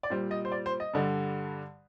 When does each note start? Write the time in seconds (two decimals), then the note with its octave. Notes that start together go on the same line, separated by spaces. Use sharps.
0.03 D5
0.10 A#2 G3 C5
0.31 D#5
0.45 C5
0.52 D5
0.66 C5
0.80 D#5
0.94 G2 D3 G3